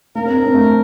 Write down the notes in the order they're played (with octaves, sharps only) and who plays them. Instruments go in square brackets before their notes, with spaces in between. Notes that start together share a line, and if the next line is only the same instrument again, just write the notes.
[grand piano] A#3 [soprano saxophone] A#4
[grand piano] C4
D4
C4
A3